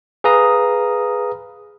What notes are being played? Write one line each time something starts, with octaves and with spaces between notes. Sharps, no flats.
G#4 B4 F5 A#5 D#6